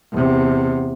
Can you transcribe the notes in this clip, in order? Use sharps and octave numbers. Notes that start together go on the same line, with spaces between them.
E2 C3